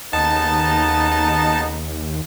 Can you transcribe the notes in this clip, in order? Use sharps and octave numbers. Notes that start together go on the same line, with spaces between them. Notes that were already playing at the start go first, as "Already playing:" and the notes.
D#2 C#3 B3 D#4 A5